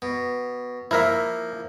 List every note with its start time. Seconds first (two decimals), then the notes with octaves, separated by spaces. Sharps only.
0.02 B2
0.91 F3 A#3 E4 A#4 E5